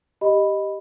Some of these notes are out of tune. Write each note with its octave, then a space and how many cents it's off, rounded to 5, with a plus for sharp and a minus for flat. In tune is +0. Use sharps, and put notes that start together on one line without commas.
G4 +0 D#5 +0 B5 +0